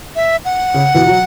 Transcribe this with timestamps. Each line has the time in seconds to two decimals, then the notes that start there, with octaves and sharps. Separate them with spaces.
0.16 E5
0.45 F#5
0.74 C#3
0.94 B2 E3
1.07 F#3